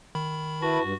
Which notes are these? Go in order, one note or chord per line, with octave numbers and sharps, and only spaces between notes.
D#3 B5
E4 F#4 B4 A5
G2